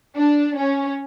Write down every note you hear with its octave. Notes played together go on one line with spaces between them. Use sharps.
D4
C#4